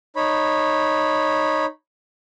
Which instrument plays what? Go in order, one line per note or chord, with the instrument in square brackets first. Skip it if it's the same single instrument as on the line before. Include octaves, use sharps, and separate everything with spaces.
[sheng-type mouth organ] D#4 C#5 B5